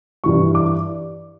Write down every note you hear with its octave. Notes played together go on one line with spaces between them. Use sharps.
G2 E3 G3 C#6
D6